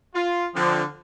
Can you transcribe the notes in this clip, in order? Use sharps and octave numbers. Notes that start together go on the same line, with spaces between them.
F4
D3 F3 C4